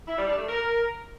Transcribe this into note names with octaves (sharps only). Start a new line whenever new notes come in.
E4
G3
D4
A3
A#4